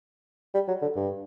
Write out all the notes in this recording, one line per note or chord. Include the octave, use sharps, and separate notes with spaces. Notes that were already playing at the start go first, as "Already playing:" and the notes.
G3
F#3
D3
G2